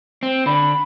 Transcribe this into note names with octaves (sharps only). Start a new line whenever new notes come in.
C4
D3 B5